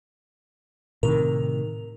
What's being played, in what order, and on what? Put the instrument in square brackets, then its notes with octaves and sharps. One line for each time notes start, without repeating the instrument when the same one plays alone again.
[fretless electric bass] A2 C3 D#3 [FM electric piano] A#4